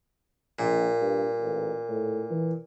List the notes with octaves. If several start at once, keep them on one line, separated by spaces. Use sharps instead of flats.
A#1 A#2
G2
A1
A2
E3